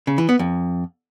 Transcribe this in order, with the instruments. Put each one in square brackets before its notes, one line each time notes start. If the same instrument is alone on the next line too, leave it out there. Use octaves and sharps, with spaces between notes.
[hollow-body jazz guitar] C#3
E3
B3
F2